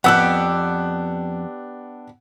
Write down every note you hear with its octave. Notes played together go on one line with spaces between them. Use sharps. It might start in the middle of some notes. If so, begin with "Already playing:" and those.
F2 B3 D4 G4 F#5 E6 F#6